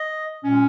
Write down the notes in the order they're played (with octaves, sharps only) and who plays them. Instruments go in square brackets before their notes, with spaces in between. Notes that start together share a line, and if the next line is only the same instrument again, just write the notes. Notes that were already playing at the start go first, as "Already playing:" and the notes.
Already playing: [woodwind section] D#5
A#2 G#3 C#4